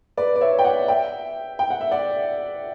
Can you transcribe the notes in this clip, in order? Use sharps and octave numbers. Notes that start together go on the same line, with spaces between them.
B4 D5
D5
C#5 E5
G5
D5 F#5
E5 G5
G5
F#5
E5
D5 F#5